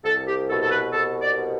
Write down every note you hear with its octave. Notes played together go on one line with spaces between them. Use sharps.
C2 A4
G4
B2 A4
A4
B4
C2 A4
D5
B2